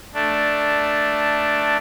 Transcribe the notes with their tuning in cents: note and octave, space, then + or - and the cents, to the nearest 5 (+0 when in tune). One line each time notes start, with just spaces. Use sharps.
A3 +0 D4 +0